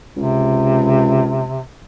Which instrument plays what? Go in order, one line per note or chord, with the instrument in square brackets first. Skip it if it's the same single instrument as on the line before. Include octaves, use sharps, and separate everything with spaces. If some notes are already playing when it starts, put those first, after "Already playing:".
[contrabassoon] C#2 [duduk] C3